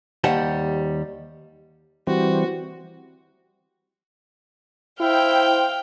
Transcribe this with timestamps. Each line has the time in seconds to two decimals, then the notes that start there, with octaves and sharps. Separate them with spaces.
0.24 D#2 G3 C5 F#5 A5
2.07 E3 G3 C4 F#4
5.00 E4 C5 F5 G5